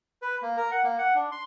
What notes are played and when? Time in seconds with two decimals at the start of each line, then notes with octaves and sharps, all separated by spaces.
0.22 B4
0.42 A#3
0.57 A#4
0.71 F#5
0.84 A#3
0.99 F#5
1.15 D4
1.32 C6